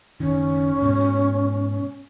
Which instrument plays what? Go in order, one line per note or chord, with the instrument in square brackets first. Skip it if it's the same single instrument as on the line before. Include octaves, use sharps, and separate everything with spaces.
[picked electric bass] F#1 D#3 [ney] C#4
[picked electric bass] G#2 B2